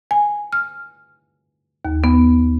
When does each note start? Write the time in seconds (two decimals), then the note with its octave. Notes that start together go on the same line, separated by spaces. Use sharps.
0.11 G#5
0.53 F6
1.85 D#2
2.04 B3